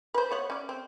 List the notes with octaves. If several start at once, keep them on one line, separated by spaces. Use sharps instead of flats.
B4 C5
B3 C#5 F#5
C#4 D5
C4